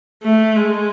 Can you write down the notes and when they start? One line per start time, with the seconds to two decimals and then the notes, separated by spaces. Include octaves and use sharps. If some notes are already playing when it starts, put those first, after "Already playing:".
0.23 A3
0.56 G#3